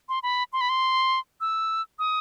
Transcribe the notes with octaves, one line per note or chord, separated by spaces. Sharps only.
C6
B5
C6
B5
C6
E6
D#6